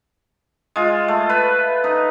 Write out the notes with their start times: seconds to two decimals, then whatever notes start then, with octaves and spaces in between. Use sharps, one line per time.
0.76 G#3 F4
1.08 A3
1.29 B4
1.84 D#4